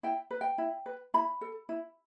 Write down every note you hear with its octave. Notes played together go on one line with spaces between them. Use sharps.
E4 G5
B4
G5
E4
B4
E4 B5
A4
E4